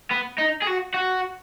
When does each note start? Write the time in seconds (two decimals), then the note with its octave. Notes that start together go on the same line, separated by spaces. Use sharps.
0.11 B3
0.39 D#4
0.62 G#4
0.67 F#4
0.94 F#4